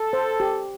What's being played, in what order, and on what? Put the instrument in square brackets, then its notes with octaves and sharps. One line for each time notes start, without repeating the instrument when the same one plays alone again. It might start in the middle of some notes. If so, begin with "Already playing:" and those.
Already playing: [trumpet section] A4
[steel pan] C5
G4